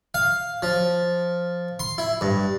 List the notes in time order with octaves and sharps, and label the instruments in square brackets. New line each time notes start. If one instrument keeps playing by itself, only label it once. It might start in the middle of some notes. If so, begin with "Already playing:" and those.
[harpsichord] F5
F3
C6
E4
G2